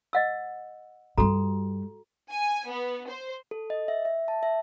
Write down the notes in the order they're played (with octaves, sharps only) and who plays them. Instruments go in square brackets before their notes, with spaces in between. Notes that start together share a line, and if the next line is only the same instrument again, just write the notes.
[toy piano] D#5 F#5 E6
[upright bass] G2 G3 [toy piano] F#4 A4 A#5
[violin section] G#5
B3
C5
[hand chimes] A4
D#5
E5
E5
A5
E5